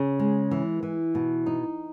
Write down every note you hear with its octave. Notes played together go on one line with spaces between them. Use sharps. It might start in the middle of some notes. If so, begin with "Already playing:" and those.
Already playing: C#3
G#3
E3
E3
B2
D#4